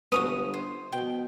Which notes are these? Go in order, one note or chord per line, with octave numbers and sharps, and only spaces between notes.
G1 B3 C#4 F#4 D#6
C5
B2 G5